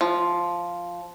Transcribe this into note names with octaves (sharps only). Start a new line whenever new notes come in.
F3